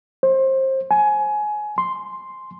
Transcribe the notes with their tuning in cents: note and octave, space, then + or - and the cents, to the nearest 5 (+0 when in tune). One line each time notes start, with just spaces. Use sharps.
C5 +25
G#5 +20
C6 +0